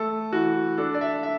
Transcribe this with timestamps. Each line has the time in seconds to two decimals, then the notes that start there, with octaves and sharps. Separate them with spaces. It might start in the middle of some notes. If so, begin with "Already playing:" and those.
Already playing: A3 A4
0.33 E3 F#4
0.78 D4 A4
0.94 D5
1.01 E5
1.23 E5